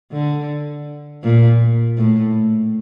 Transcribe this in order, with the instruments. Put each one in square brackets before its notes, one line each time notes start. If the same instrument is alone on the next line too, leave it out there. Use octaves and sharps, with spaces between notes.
[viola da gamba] D3
A#2
A2